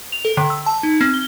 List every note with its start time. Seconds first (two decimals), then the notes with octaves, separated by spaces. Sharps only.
0.12 F7
0.25 A4
0.37 D3
0.50 E6
0.66 A5
0.83 D#4
1.01 C4
1.14 G7